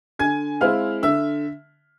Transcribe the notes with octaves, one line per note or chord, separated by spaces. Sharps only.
D3 G#5 G#6
G#3 C4 E4 F5 F6
D3 E5 E6